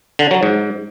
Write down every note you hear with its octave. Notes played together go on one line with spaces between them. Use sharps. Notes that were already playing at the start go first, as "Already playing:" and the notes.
D3
F#3
G#2